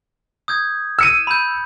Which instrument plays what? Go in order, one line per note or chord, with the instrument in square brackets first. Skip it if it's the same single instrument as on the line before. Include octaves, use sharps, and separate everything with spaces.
[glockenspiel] D#6 G6 G#6
[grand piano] E6 C#7 D#7
[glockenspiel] B5 G6